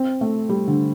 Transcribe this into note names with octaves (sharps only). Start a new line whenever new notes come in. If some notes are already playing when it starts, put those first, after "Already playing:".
Already playing: C4
A3
G3
D3